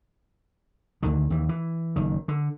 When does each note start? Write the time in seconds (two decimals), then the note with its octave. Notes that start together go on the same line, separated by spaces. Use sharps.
1.03 D2 D3 D#3
1.30 D#2 E3
1.49 E3
1.96 F#1 D#3
2.28 D3